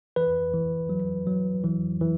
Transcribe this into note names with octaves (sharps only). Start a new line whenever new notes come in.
E3 B4
E3
F#3
F#3
E3
E3